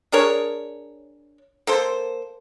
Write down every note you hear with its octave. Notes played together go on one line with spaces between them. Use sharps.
D4 G#4 A#4 C#5
A#3 A4 C5